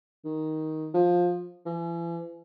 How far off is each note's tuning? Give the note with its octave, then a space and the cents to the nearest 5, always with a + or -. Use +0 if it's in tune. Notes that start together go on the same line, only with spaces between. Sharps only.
D#3 +10
F3 +15
E3 +40